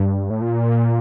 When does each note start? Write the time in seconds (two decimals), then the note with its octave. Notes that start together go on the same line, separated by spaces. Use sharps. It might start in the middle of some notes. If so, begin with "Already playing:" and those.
Already playing: G2
0.30 A2
0.41 A#2